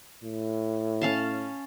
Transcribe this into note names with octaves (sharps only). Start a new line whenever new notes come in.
A2
C#4 F5 A5